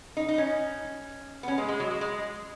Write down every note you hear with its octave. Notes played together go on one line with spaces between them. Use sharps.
D#4
D#4
C#4
B3
C#4
G#3
G#3
F#3
G#3
G#3